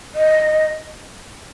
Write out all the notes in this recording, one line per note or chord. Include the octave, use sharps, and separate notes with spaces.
D#5